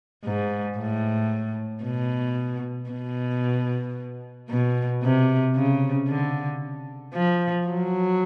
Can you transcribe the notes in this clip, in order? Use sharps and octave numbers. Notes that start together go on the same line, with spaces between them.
G#2
A2
B2
B2
B2
C3
C#3
D3
F3
F#3